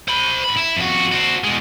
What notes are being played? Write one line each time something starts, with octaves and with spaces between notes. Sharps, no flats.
C5 B5
G#2 B5
E4
F2 F#4
F#4 C5
B2 G#3